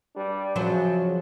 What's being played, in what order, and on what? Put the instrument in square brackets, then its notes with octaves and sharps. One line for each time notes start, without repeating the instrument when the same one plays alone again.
[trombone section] G2 G3 D4
[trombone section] F#2 C#3 [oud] F3 F#3 C5